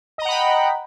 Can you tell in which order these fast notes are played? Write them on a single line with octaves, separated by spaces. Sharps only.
D#5 A#5 F#5 B5 G5